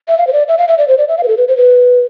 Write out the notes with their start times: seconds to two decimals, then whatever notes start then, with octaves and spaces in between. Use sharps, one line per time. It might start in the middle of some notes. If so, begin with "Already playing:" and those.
0.08 E5
0.18 F5
0.27 C5
0.33 D5
0.48 E5
0.58 F5
0.68 E5
0.78 D5
0.88 C5
0.98 D5
1.08 E5
1.18 F5
1.23 B4
1.28 A4
1.37 B4
1.48 C5
1.57 B4